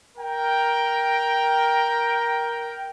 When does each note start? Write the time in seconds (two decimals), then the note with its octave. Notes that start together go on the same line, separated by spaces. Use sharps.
0.18 A#4 G5